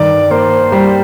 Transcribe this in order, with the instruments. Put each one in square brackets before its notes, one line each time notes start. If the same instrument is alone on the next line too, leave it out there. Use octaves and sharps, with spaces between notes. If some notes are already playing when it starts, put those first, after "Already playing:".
Already playing: [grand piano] G2 D#3 [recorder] D5
[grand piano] A#3 [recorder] C5
[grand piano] G3